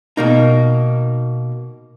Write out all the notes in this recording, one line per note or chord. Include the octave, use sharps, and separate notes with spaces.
B2 A#3 D#4